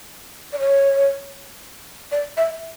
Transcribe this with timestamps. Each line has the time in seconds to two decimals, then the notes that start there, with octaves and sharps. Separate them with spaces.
0.53 D5
0.59 C#5
2.12 D5
2.37 E5